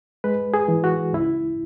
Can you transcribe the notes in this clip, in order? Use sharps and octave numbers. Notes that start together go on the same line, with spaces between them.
G#3 B4
G#4
E3
F#4
C#2 E4